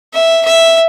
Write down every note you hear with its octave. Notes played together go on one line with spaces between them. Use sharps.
E5
E5